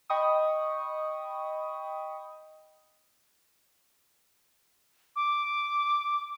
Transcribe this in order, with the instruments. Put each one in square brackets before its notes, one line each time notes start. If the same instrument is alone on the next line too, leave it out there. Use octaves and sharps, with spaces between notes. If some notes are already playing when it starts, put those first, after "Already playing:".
[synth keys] D#5 G5 B5 C#6 D#6
[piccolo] D6